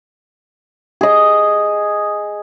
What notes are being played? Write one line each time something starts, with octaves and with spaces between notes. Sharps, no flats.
G#4 D#5